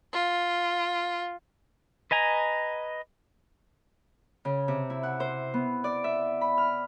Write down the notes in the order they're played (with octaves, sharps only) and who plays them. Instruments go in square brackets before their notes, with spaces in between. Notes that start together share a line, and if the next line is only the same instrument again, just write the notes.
[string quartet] F4
[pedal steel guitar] B4 D#5 G#5 A#5
[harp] C#3
C3
E4
F#5
C5
B3
D5
E5
B5
F6